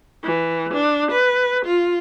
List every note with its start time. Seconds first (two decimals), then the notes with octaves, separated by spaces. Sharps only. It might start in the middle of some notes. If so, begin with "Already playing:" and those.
0.23 E3
0.74 D4
1.12 B4
1.66 F4